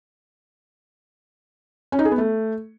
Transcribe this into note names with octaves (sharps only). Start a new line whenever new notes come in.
C#4
D#4
G#4
B3
A3